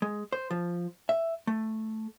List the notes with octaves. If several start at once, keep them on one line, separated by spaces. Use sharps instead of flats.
G#3
C5
F3
E5
A3